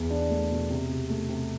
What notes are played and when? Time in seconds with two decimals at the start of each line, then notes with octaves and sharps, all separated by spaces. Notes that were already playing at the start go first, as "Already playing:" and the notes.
Already playing: E2
0.10 D4
0.30 A3
0.50 B2
0.70 C3
0.89 C3
1.10 A3
1.29 C3